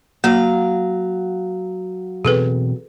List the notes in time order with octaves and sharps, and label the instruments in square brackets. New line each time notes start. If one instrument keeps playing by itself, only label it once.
[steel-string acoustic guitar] F#3 F5 [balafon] A#3
[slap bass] B2 E3 C4 [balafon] G#4 A4 B4